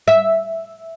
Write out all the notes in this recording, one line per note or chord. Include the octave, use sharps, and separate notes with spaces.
E5